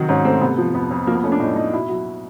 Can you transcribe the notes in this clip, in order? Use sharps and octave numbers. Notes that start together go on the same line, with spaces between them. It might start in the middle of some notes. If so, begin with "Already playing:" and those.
Already playing: C3 D#3 F#3 F#4
G#2 C#4
A3 C4
C3 B3
F3
F2 B3
F2
F3 A#3
B3
A3 C#4
D4
A2 D#4
A2 D#4
B2 E4
F#3